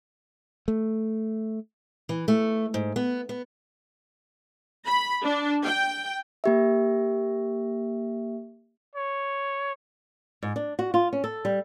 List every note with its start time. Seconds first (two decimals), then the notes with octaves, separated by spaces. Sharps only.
0.68 A3
2.09 E3
2.28 A3
2.74 G#2
2.96 B3
3.29 B3
4.86 B5
5.23 D4
5.64 G5
6.44 A#3 G4 E5
8.95 C#5
10.42 G#2
10.56 D4
10.79 F#4
10.94 F4
11.13 C#4
11.24 A4
11.45 G3